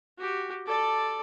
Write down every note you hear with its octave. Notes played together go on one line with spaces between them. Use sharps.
F#4 G4
A4 D5